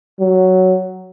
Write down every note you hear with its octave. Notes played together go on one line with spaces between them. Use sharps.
F#3